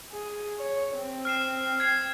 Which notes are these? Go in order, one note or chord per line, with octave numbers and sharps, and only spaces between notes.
G#4
C#5
C4
F6 C7 E7
G#6 C7